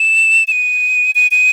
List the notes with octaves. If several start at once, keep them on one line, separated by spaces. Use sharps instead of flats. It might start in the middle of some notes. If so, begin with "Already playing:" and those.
Already playing: E7
E7
D#7
D#7
D#7